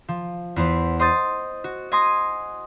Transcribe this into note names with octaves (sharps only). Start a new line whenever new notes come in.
F3
E2 B3 B4 C5
C5 D#5 C6 D#6 G6 A6
F#4
D#5 G#5 C6 D#6 G#6 A#6